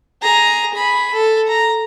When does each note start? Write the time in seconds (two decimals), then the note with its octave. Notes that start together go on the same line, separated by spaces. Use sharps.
0.22 G#4 A#5
0.74 G#4 B5
1.13 A4
1.48 A#5